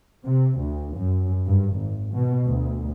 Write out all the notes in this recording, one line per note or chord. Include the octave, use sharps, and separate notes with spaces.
C3
D2
F#2
G2
G#1
B2
D2